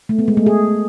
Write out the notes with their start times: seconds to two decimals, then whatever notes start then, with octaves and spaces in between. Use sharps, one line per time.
0.09 A3
0.19 B3
0.28 G#3
0.37 A3
0.46 G#4